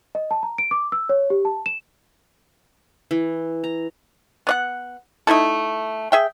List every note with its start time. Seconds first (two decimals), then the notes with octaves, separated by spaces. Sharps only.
0.15 D#5
0.31 A5
0.43 A#5
0.58 D7
0.71 D6
0.92 E6
1.09 C#5
1.30 G4
1.45 A5
1.66 E7
3.11 E3
3.64 A#5
4.47 B3 D5 F#5
5.27 A3 D#4 E4 A4
6.12 G#4 E5 G5